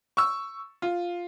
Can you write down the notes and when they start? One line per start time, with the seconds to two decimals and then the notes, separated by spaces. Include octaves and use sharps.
0.17 C#6 E6
0.82 F4